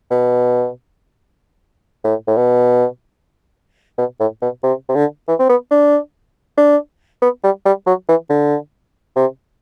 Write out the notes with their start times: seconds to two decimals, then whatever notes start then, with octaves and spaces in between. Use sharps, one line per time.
0.11 B2
2.04 A2
2.27 A2
2.37 B2
3.98 B2
4.20 A2
4.42 B2
4.63 C3
4.89 C3
4.95 D3
5.28 E3
5.39 C4
5.49 B3
5.71 D4
6.57 D4
7.22 B3
7.44 G3
7.65 G3
7.87 F#3
8.09 E3
8.30 D3
9.16 C3